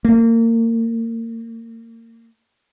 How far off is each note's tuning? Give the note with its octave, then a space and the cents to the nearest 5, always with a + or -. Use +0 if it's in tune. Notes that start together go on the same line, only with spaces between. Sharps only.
A#3 -30